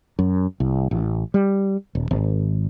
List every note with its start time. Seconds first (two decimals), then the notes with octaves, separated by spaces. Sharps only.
0.19 F#2
0.60 C2
0.91 A1
1.34 G3
1.95 D#1
2.11 G#1